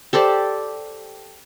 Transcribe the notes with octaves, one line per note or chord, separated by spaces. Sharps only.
G4 A4 C5 D5